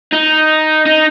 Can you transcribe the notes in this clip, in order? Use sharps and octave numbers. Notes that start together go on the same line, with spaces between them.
D#4
D#4